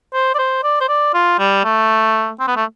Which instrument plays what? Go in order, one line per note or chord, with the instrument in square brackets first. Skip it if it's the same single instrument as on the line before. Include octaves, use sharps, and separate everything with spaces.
[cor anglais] C5
D5
C5
D5
C5
D5
F4
G3
A3
C4
B3
A3